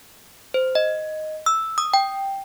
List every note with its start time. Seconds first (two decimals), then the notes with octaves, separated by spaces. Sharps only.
0.54 C5
0.75 D#5
1.46 E6
1.78 D#6
1.94 G5